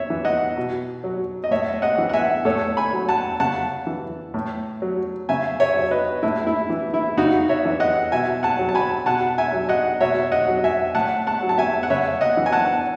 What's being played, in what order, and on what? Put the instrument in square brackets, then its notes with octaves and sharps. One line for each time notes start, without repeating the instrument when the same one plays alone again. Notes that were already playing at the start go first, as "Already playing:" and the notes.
Already playing: [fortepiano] C#5 E5
E3
D#5 F#5
B2
F#3
D#5
A2 C#5 E5
D#5 F#5
E3
F#5
E5 G#5
A2 A4 C#5
G#5 B5
F#3
F#5 A5
C#3 F#5 A5
E3
A2
F#3
C#3 E5 G#5
C#5 E5
F#3
B4 D#5
A2 E4
E4
E3
E4
C#3 D#4 F#4
C#5 E5
E3
D#5 F#5
B2 E5 G#5
F#5 A5
F#3
A5
G#5 B5
B2 F#5 A5
E5 G#5
F#3
D#5 F#5
B2 C#5 E5
D#5 F#5
F#3
E5 G#5
A2 F#5 A5
F#5 A5
F#3
A5
E5 G#5
F#5
C#3 C#5 E5
D#5 F#5
E3
G#5
F#5 A5